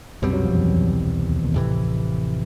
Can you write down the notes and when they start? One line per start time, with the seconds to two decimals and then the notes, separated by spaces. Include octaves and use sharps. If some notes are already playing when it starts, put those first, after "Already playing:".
0.22 C2 F#2 B2 F#3 G3 C4
0.33 F#2 F#3
0.44 F2 F3
0.55 E2 E3
1.21 D#2 D#3
1.43 D#2 D#3
1.54 A1 F2 A2 C3 E3